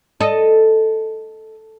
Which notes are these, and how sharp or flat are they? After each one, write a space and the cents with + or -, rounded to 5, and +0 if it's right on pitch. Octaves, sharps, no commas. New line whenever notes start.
A4 +0 D#5 +0